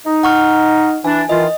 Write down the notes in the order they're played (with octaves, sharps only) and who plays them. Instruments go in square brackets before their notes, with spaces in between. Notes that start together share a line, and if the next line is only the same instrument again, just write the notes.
[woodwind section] D#4
[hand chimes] F#5 C#6 F6
[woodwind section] E3 D4 [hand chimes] G#5
[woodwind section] D#3 E3 F4 [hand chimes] D#5